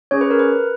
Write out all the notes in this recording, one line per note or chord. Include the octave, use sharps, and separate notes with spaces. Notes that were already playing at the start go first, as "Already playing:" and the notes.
C#4 G#4 C#5
B4
A#4
B4